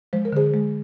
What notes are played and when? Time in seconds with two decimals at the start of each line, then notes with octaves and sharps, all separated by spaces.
0.13 F3 G#3 C5
0.25 A#4
0.33 D3 G#4 C5
0.53 G#3